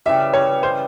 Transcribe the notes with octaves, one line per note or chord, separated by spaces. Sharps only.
C#3 E3 G3 E5
C#5
C5